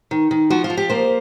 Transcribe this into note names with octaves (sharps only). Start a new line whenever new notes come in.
D#3
D#3
F3 F#4
F4
F3
G4
A#3 C5